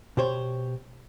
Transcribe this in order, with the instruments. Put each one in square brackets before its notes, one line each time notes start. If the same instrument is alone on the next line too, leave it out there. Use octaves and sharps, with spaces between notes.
[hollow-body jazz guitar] B2 G4 C5 C#5